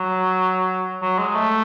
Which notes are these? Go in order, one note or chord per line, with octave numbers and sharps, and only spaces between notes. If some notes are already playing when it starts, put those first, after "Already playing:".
Already playing: F#3
F#3
G#3
A3